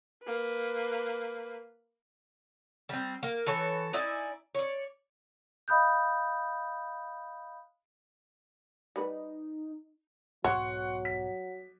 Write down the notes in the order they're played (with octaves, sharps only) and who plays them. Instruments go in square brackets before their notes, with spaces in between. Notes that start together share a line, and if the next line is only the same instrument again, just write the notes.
[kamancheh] A#3 B4
[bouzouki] G3 C4
A#3
E3 A4 C#5
D#4 E4 D5 G#5
C#5 D5
[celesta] D#5 F5 B5 D#6 F#6 G6
[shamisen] G3 B4 [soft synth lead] D#4
[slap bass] B1 G#2 B2 [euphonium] F#3 [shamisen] C#5 [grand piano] F#5 C6 C#6
[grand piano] B6